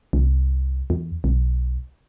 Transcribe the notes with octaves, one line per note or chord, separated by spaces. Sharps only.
C2
E2
B1